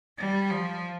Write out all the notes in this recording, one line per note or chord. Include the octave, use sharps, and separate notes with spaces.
G3
F3